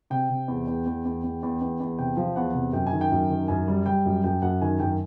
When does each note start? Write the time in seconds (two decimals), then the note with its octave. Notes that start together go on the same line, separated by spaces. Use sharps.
0.10 C3 G5
0.30 C3
0.48 E2
0.67 E2
0.86 E2
1.05 E2
1.24 E2
1.43 E2
1.61 E2
1.80 E2
1.99 C3 G5
2.17 F3
2.36 E2 F#5
2.54 C3
2.73 F#2 G5
2.87 G#5
2.93 D#3
3.01 G5
3.12 F#2
3.31 D#3
3.48 F#2 G#5
3.68 G3
3.86 G3 G5
4.06 F#2
4.24 F#2 G5
4.42 F#2 F#5
4.61 D#3 G#5
4.80 F#2 G5